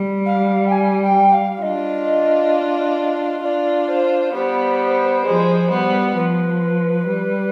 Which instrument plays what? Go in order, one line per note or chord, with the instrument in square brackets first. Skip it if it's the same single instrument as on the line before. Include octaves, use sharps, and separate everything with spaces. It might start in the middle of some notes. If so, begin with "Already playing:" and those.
Already playing: [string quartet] G3
[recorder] F5
G5
G#5
G5
F5
[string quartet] D4 F4 [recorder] D#5
[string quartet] D4 F4 [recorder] D5
[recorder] C5
[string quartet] G3 B3 [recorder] C5
[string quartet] F3 G#3
G3 B3
[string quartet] F3 [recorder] B4
[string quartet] G3